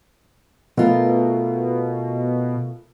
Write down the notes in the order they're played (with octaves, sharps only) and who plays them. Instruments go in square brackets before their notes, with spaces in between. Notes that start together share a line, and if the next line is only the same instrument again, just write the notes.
[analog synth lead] B2 [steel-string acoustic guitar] A3 F4 A#4